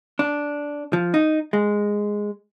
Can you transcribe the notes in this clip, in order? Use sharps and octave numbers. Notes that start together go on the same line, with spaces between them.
D4
F3
D#4
G#3